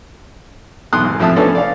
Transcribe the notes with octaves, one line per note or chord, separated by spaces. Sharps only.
B1 E2 C6 D#6 F#6
G#1
A2 F3 C4 E5 A5 D#6
F3 B3 C#4 D4 A4
D5 F5